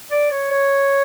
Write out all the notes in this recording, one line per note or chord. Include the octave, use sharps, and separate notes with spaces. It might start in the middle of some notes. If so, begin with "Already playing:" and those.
D5
C#5
C#5